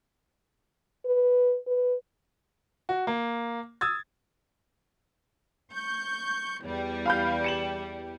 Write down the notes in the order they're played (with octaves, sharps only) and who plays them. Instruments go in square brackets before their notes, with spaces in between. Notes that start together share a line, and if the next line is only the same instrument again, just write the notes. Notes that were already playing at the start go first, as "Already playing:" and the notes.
[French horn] B4
B4
[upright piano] F#4
A#3
D#6 E6 G#6 A6
[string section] C#6 G6
E2 G3
[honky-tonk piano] F5 B5 G6
C#7 E7 F#7